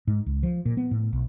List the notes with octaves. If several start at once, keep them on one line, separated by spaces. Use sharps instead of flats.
G#2
C#2
F3
A#2
B3
A2
B1